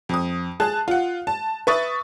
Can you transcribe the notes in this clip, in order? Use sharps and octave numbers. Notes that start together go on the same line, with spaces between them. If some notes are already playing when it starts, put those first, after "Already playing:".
F2 D#6
G#4 A5 F#6
F4 F#5
A5
B4 E5 C#6 D#6 A6